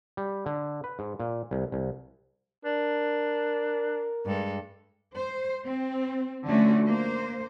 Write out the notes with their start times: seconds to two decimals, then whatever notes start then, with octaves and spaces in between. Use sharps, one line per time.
0.17 G3
0.46 D3
0.84 B4
0.99 G#2
1.20 A#2
1.51 C2
1.72 C2
2.65 D4 A#4
4.25 G2 G#3 A4
5.14 C5
5.64 C4
6.46 D3 F3 A3 C#4 F#4
6.86 A#3 C5